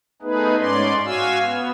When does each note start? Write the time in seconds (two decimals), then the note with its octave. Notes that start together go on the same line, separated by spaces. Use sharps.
0.22 A3 B3 D#4 G#4 B4
0.58 G#2 C#4 D5 C6
1.05 F#4 F5 G#5 E6
1.43 B3